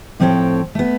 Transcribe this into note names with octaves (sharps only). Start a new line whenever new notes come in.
A2 F3 C4 A4 C#5 G5
A3 B3